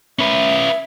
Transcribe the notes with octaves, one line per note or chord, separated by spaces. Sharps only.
C#4 B4 E5